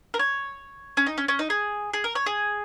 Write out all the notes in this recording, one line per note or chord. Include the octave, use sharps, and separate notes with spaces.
A#4
C#5
C#4
D#4
C#4
C#4
D#4
G#4
G#4
A#4
C#5
G#4